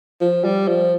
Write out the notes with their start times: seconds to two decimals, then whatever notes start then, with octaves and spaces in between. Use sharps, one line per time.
0.21 F3
0.44 G3
0.68 F3